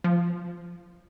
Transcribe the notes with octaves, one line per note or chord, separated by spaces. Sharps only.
F3